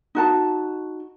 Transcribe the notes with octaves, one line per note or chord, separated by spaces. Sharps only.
D#4 F#4 A5